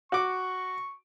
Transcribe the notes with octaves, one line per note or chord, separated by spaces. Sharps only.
F#4 C#6 D6